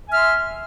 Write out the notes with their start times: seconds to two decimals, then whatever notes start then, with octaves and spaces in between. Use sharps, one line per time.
0.07 G#5
0.10 E5
0.13 F6
0.16 C6